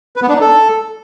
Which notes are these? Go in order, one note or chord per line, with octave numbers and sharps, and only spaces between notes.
B4
B3
D4
D#4
A4